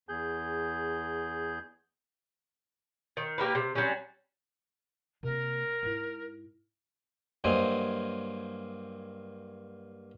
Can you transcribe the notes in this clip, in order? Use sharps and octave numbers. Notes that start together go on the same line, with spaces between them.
E2 G#4 G6
D#3
A#3 G4 A#4 B4
C3
F#3 G3 C4 C#4
C3 A#3 A#4
G#2 E4
G2 F#3 A#3 C5 D#5 G#5